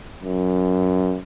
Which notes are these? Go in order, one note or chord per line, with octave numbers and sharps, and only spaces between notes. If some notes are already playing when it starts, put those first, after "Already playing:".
F#2